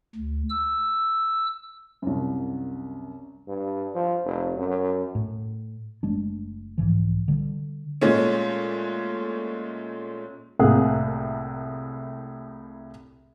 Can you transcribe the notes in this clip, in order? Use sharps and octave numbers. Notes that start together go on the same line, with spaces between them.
D2
E6
C2 F#2
G2
F3
F1
F#2
A2
F#1 G#3 A3 D4
B1 G#2 E3 F3
D3 G3
A#2 G#3 A3 C#4
C2 A2 A#3 G#4 F#5